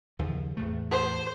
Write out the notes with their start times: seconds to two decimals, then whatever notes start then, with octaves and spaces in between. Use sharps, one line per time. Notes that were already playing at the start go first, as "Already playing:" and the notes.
0.19 D#2 C#3 F3
0.57 E2 A2 A3
0.92 C5